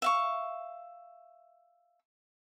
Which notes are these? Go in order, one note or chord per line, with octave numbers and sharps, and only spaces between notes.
E5 F5 C#6